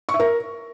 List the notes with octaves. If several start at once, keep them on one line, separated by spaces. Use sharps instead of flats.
C#6
E5
A#4